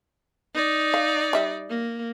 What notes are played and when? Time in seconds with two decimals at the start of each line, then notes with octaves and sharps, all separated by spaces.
0.54 D#4 D5
0.94 F5
1.33 G3 E5
1.70 A#3